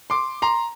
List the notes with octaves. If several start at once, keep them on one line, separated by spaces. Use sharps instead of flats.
C6 D6
A#5 C6